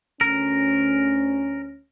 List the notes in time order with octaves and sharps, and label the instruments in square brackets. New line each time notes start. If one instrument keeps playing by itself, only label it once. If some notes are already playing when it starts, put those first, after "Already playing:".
[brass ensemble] D2 C#4 [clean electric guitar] A#4